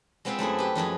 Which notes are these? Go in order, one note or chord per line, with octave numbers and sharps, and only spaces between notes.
G#3 B3 C4 F4 C5 E5
F#2 A3 E4 G#4
G4 B4
F#2 F3 G#3 G#4